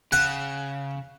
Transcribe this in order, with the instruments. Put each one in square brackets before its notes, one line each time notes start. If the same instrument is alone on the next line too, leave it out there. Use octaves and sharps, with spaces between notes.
[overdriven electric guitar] C#3 [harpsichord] F#5